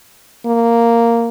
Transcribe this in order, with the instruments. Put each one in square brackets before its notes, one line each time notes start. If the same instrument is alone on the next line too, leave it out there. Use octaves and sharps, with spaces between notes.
[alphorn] A#3